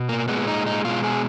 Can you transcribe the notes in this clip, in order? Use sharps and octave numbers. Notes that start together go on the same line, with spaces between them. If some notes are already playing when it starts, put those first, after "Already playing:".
Already playing: B2
A#3
A#2 G#3 B3
D#4
D#4
B2 G#3 F4
G#4